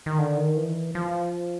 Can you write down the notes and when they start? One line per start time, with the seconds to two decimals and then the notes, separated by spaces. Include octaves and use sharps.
0.06 D#3
0.19 D3
0.37 D#3
0.57 E3
0.95 F3